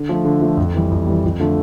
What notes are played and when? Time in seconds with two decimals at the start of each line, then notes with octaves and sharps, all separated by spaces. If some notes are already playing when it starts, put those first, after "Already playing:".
Already playing: D3
0.09 F3 A3
0.25 D3
0.42 F3 A3
0.57 F2
0.74 E3 G3
0.91 F2
1.07 E3 G3
1.24 F2
1.40 D3 F3 A3